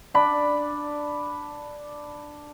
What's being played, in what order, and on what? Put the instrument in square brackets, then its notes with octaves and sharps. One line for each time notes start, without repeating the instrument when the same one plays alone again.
[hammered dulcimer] D4 D5 B5